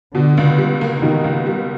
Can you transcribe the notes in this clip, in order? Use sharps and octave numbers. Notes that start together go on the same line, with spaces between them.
B2 D3
C#2
G3
A#3
B2 D#3
C#2
G3